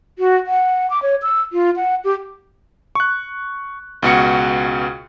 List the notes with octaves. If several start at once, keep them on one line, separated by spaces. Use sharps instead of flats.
F#4
F#5
D6
C#5
E6
F4
F#5
G4
C#6 F#6
C#2 B2 F#4 C#7